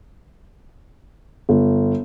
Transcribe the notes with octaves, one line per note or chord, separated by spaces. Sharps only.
G1